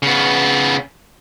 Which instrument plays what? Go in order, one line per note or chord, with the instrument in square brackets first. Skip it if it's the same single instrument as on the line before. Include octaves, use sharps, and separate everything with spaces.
[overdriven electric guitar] C#3 B3